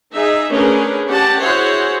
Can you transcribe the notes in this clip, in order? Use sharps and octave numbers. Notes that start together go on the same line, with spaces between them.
D#4 G#4 E5
A3 C#4 D4 G#4 A#4 B4
C#4 G4 F#5 A5
E4 F#4 G#4 C5 C#5 F#5